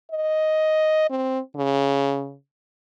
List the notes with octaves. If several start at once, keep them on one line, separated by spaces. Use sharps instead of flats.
D#5
C4
C#3